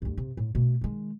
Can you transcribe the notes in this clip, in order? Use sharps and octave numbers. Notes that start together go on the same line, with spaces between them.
D2 G2
C3
A2
B2 A3
D#3 G#3